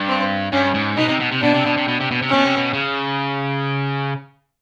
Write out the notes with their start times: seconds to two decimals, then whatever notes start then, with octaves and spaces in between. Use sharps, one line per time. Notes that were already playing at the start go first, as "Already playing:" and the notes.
Already playing: G2
0.08 C4
0.52 G2 C#4
0.74 G#2
0.97 B2 D#4
1.08 C3
1.19 B2
1.31 C3
1.41 B2 D4
1.54 C3
1.65 B2
1.76 C3
1.88 B2
2.00 C3
2.11 B2
2.22 C3
2.29 B2 C#4
2.45 C3
2.57 B2
2.73 C#3